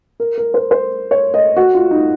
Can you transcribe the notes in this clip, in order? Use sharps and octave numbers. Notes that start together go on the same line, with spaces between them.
A#4
A#4
C5
C5
C#5
D#5
F#4
F4
D#4